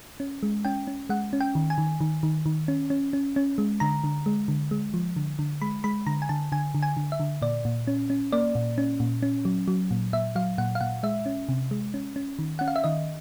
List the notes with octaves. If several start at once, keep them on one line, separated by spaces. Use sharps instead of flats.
C#4
G#3
C#4 G5
C#4
G#3 F#5
C#4
G5
D#3
G#5
D#3
D#3
D#3
D#3
C#4
C#4
C#4
C#4
G#3
D3 A#5
D3
G#3
D3
G#3
F3
D3
D3
G#3 B5
G#3 B5
D3 A#5
G#5
D3 A5
D3 G#5
D3
G#5
D3
E5
D3
A#2 D5
A#2
C#4
C#4
A#3 D5
A#2
C#4
A#2
C#4
F#3
F#3
A#2
A#2 E5
F#3 F5
A#2 F#5
F5
A#2 F#5
G#3 E5
C#4
C3
G#3
C#4
C#4
D#3
C#4 F#5
F5
E5
D#3 D#5